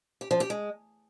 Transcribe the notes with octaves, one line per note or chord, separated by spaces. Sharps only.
G4
F3
G4
G#3